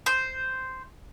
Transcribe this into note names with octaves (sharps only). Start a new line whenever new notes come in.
C5